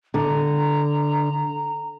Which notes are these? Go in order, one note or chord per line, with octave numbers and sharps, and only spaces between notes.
D3 A#5